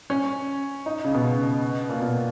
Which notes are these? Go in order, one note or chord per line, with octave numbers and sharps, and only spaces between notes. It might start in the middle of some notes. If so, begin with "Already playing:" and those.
C#4
D#4
C#3
B2
A#2
B2